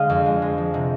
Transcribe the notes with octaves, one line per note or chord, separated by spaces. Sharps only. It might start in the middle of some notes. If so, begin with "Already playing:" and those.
Already playing: D3 G#3 D#5 F5
F2
G#3
G#3
F3
C3